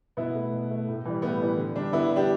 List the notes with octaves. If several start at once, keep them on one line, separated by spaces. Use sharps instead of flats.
B2 B3 E4
A3
B2
A3
A2
E3 G3
A2 B3
E3 G3
D3
G3 D4
D3 B3 E4
G3
D4 G4